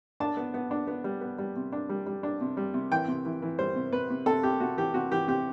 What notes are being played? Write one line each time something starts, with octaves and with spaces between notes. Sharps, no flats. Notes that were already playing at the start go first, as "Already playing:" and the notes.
D4 A5
B3
B3
D4
B3
G3
B3
G3
C3
D4
G3
G3
D4
C3
G3
C3
E3 G5
C3
E3
E3
G3 C5
C3
C3 B4
C3
C3 A4
C3 G4
C3 F#4
E3 G4
C3 F#4
E3 G4
C3 G4